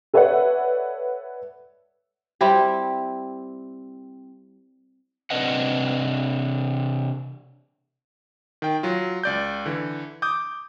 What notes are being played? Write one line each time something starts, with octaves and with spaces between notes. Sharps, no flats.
A4 B4 C#5 D5 E5 F#5
G3 C4 E4 G4
C3 D4 B4 D#5 F#5
D#3 G5
F#3 F4
C#2 D5 G6
D3 E3
D6 D#6 G6